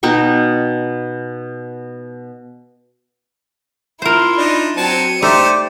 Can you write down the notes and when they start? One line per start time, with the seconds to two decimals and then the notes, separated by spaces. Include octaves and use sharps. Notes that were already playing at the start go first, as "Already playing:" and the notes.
0.03 B2 D#4 G5 C#6
4.02 E4 F4 A#4 C5
4.36 D4 D#4
4.77 F#3 C4 A5 C#7 D#7
5.22 A3 D#4 G4 C5 D5